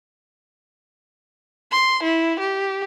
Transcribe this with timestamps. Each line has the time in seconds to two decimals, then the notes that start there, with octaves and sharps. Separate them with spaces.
1.71 C6
2.03 E4
2.39 G4